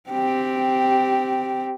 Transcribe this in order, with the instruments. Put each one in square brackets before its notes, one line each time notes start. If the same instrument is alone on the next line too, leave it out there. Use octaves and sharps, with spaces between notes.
[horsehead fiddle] C4 G4